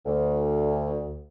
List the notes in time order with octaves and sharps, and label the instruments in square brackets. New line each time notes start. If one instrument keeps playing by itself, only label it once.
[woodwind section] D2